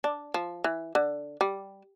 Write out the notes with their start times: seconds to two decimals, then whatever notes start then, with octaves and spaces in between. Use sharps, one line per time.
0.04 D4
0.34 F3
0.64 E3
0.95 D3
1.41 G3